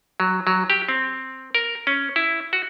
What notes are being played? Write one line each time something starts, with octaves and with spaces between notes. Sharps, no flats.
F#3
F#3
G4
C4
A#4
C#4
E4
F#4